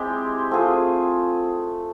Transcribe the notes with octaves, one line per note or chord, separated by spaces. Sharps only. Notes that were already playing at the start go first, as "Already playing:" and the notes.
Already playing: G#3 C4 E4 G4
A3 C4 F4 G#4